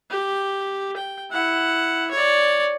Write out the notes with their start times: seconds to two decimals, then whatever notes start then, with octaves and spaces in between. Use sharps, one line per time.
0.11 G4
0.96 G5
1.31 E4 F#5
2.11 C#5 D5